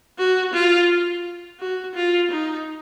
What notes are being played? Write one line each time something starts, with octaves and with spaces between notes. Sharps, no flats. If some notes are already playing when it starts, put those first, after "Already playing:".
F#4
F4
F#4
F4
D#4